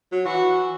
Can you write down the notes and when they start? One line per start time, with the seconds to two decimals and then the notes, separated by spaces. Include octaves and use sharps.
0.12 F#3
0.26 E3 F#4